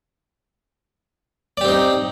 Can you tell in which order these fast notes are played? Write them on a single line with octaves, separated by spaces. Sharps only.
D5 G4 C4 D#4